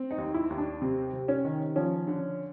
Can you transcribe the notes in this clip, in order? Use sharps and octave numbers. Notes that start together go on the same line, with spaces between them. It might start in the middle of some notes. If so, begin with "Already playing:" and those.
Already playing: C4
D#4
D#2
E4
D#2
D4
C3 C4
C3
C#4
D#3
F3 C#4
D3